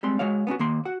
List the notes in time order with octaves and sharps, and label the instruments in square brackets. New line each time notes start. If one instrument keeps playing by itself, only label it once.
[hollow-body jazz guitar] G3 G#3 C4 C6
G#3 F#4 C#5 F5
B3 C#4 D4 F#4
D#2 A#3 C6
F#4 F#5